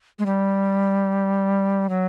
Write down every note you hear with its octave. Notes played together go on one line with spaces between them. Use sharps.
G#3
G3
F#3